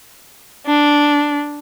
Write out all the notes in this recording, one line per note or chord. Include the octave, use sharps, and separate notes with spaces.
D4